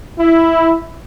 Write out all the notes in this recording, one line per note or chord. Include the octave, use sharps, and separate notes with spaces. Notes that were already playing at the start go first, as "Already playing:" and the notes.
E4